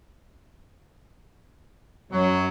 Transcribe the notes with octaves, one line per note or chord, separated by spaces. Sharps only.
F#2 F#3